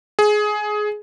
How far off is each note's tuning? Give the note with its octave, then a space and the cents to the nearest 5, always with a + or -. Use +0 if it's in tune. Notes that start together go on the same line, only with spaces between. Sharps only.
G#4 +15